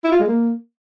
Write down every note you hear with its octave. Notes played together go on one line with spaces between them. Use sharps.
E4
F4
G#3
A#3